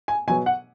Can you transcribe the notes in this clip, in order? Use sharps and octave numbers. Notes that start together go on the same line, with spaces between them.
G#5
B2 F#3 B3 G#5
F#5